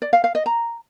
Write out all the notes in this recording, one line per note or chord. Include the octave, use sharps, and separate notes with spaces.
D5
F5
F5
D#5
A#5